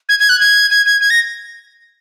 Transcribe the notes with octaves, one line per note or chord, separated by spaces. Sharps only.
G#6
G#6
F#6
G#6
G#6
G#6
G#6
A#6